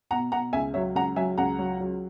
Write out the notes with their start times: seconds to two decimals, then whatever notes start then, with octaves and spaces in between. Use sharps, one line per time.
0.11 B2 F#5 A#5
0.32 B2 F#5 A#5
0.53 C#2 E5 G#5
0.74 F#3 C#5 E5
0.95 C#2 F#5 A#5
1.16 F#3 E5 G#5
1.38 C#2 F#5 A#5
1.59 F#3
1.80 F#3